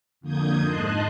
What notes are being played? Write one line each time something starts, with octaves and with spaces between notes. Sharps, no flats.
F2 D3 A#3 D#6 G6 G#6
G#2 D#5 A5 C6 F#6